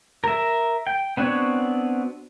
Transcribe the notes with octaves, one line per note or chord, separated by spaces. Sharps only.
A#4 E5
G5
B3 C4 D4 F#4 C#5